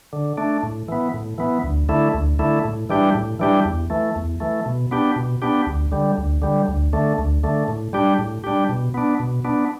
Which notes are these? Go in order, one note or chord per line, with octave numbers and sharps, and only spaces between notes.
D3
A3 D4
A2
E3 B3
A2
E3 B3
D2
D3 A3 E4
D2
D3 A3 E4
A2
E3 G3 D4 G4
A2
E3 G3 D4 G4
E2
E3 A3
E2
E3 A3
B2
B3 D4 G4
B2
B3 D4 G4
D2
D3 G3
D2
D3 G3
D2
D3 A3
D2
D3 A3
A2
G3 D4 G4
A2
G3 D4 G4
B2
B3 D4
B2
B3 D4